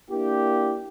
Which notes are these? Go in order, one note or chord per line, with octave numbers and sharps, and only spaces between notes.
A#3 D4 E4 G4